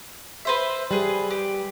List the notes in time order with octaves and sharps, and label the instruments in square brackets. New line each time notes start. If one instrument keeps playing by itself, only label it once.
[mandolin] B4 C5 E5
[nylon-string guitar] G3 [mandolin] G#4 B4
[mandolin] G4